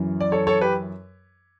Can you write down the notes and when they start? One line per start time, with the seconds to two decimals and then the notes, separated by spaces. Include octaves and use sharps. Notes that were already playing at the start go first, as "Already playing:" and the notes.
Already playing: F#2 E3
0.21 D5
0.32 A4 C#5
0.47 A4 C#5
0.61 G4 B4